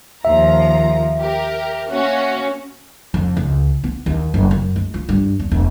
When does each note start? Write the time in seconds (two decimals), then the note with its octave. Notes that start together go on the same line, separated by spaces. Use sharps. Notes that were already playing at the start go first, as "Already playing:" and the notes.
0.25 D#2 F3 E5 A#5
1.19 G4 A#4
1.90 A#3 C#4 F#4
3.14 F2
3.37 C#2
3.84 B3
4.06 D#2
4.34 F#1
4.51 F#2
4.76 G#3
4.94 F4
5.09 G2
5.39 E2
5.52 E1